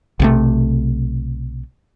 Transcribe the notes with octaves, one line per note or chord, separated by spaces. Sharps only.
B1 C3 A3